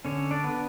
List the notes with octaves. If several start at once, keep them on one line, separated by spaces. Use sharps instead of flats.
D3 C#4 C#5
D4 D5
B3